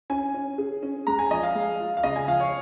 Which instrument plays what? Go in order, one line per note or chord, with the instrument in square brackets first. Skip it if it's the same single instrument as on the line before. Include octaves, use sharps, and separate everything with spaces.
[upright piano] C#4 [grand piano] G#5
[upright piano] C#4
G#4
C#4
[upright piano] G#3 [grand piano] A#5
[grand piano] G#5
[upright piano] F3 [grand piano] D#5
[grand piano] F5
[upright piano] G#3
F4
[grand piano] F5
[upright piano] C#3 [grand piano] D#5
[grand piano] G#5
[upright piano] F3 [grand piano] F5
[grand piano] C#5